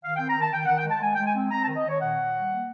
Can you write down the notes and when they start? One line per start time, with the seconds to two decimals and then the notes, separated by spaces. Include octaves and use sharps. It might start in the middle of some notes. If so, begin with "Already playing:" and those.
0.03 D#3 F5
0.16 G5
0.20 C4
0.28 A#5
0.37 D#3 A5
0.53 D#3 G5
0.66 F#5
0.70 D#3
0.78 G5
0.86 G#3 A5
1.02 G#3 G#5
1.15 G5
1.18 G#3
1.27 G#5
1.35 C4
1.51 C4 A#5
1.64 A5
1.68 D#3
1.76 D#5
1.84 D#3 C#5
2.01 A#2 F#5
2.17 A#2
2.34 G3
2.50 A#3